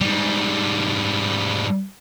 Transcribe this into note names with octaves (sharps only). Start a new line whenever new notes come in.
G#2 G3